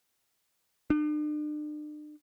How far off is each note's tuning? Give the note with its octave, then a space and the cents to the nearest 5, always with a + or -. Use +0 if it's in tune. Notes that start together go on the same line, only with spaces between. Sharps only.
D4 +40